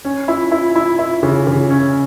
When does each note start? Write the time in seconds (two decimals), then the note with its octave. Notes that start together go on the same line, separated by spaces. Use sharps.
0.05 C#4
0.28 E4
0.52 E4
0.76 E4
0.99 E4
1.23 C#3
1.47 C#3
1.70 C#4